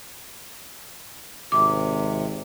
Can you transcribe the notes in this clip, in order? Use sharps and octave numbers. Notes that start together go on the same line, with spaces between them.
G#1 C3 D6